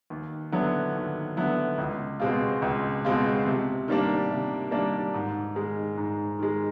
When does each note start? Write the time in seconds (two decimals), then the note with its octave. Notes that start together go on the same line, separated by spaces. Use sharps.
0.10 D#2
0.52 D3 F#3 B3 E4
0.95 D#2
1.37 D3 F#3 B3 E4
1.78 C#2
2.20 B2 G#3 C4 F4
2.62 C#2
3.05 B2 G#3 C4 F4
3.46 C3
3.88 D#3 G3 A#3 D4
4.30 C3
4.71 D#3 G3 A#3 D4
5.14 G#2
5.55 D#3 G#3
5.97 G#2
6.39 D#3 G#3